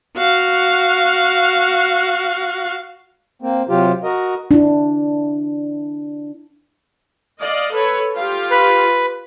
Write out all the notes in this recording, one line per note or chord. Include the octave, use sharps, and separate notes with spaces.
F#4 F5
A#3 C4
C3 F#3 F4 G4
F#4 A#4 D#5
D4 E4
D5 D#5 F5
A4 B4 C#5
F4 G4 F5
B4